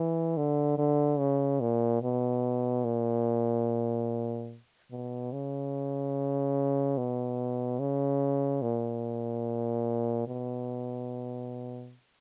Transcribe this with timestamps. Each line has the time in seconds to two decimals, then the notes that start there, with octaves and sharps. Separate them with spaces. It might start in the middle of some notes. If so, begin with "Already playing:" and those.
Already playing: E3
0.37 D3
0.78 D3
1.19 C#3
1.61 A#2
2.02 B2
2.84 A#2
4.91 B2
5.33 C#3
6.97 B2
7.79 C#3
8.62 A#2
10.27 B2